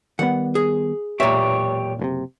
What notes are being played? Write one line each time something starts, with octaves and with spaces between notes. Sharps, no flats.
D#3 G3 B3 F#5
G#4
E1 B1 A#2 G4 C#5 E5
F#1 A2 C3